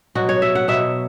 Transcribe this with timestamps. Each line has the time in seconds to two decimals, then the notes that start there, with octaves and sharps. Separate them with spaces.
0.15 B2 F#3 F#4
0.29 C#5
0.42 E5
0.55 F#5
0.68 B2 F#3 E5